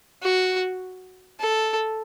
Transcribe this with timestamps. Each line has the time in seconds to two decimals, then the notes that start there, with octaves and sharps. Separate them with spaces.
0.23 F#4
1.40 A4